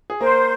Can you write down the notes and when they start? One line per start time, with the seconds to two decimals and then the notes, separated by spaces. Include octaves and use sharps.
0.10 G#4
0.20 A#3 A#4 C5